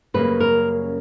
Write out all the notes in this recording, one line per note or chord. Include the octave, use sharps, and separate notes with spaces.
F#2 C#3 G3 A#3 B4
A#4